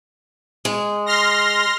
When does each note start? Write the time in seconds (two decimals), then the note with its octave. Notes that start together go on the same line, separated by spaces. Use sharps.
0.65 G#3
1.06 C6 F6 A#6